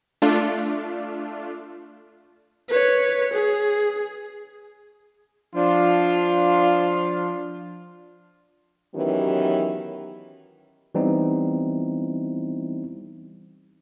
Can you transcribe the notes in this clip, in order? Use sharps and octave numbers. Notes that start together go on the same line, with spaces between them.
A3 D4 F4
B4 C#5
G#4
F3 D4 F4
D#3 E3 F#3 B3 C#4 G4
E3 G3 B3 C4 D#4 E4